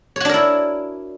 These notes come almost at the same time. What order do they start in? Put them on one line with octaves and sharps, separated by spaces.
C#5 F#4 D4 A#4 E4